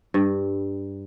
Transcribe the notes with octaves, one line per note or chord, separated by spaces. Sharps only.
G2